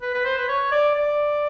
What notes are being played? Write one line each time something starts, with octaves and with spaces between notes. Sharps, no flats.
B4
B4
C5
B4
C#5
D5
D5